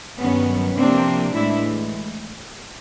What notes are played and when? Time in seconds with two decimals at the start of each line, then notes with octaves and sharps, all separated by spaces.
0.19 G2 D#3 F#3 B3 C#4
0.77 C3 F3 A#3 C4 D4
1.34 A2 E3 G#3 D4 E4